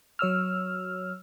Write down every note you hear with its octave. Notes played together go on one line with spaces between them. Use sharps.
F#3 C#5 E6 F6